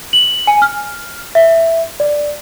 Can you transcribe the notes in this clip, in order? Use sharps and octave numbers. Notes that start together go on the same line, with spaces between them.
F#7
G#5
F6
E5
D5